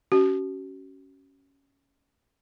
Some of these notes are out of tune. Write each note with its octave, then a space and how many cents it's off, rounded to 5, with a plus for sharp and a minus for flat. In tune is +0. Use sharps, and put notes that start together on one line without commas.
C#4 +0 F#4 +40